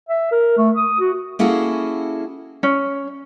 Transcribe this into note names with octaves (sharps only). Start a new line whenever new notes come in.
E5
A#4
A3
D#6
F#4
A#3 C#4 E4 F#4 G#4 A4
C#4